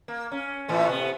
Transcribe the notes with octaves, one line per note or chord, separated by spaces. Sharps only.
A#3
C#4
A2 E3 A3
C3 B3